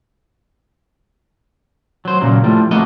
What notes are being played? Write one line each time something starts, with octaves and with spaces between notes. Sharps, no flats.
F#3 C5
A#2 C#3 F#3 A#3
A2 F3 G3
F2 A3 A#3 F#4 D#5